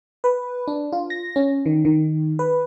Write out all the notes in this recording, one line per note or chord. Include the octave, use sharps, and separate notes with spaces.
B4
D4
F4
A#6
C#4
D#3
D#3
B4